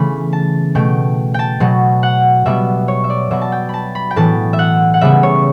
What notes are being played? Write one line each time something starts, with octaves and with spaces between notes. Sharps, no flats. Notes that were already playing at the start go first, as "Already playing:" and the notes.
Already playing: C#3 E3 A3 B3 B5
A5
B2 A3 G5
G5 A5
B2 F#3 B3
F#5
B2 G3 B3 E5
C#5
E5
D5
B2 F#3 B3 E5
A5
G5
A5 B5
B5
G5
A2 E3 B3 A5
E5
F#5
F#5
C#3 G3 B3 E5
C#5